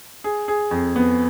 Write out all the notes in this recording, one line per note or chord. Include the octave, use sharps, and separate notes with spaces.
G#4
G#4
F2
B3